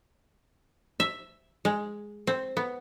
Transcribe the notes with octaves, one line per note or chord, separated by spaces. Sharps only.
E5
G#3
C4
B3